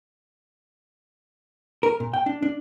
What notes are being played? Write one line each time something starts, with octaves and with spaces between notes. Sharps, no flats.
A#4
A#2
G5
D4
D4